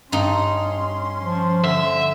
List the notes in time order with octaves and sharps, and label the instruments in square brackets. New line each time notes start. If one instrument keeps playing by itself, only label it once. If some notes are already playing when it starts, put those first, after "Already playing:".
[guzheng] G2 D#4 [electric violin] C#4 C6
[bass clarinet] F3
[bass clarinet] D3 [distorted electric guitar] E5